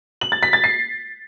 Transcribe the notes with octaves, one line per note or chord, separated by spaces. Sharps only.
F#7
A6
B6
A6
C7